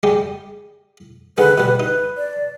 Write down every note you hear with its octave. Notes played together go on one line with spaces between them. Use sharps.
G3 G#3 G4
D3 D#3 G#3 B4
B2 G3 B4
D#4 B4
D5